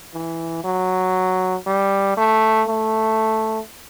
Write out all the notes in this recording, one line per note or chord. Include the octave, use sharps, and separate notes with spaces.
E3
F#3
G3
A3
A3